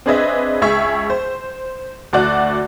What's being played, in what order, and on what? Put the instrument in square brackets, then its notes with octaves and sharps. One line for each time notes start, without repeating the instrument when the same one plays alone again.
[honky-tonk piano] C4 D4 G#4 B4 D#5 E5
C#2 G#4 E5 C#6
C5
D2 F#4 D5 F#6